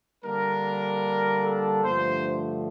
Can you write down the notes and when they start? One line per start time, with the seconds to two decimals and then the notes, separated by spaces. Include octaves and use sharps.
0.24 D3 G3 A#3 D4 A#4
1.44 A4
1.84 G2 D3 F3 A3 C5